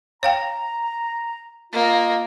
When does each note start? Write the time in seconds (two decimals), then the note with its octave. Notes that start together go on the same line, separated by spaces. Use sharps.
0.23 C#5 F5 G5 A#5
1.73 A#3 F4 D#5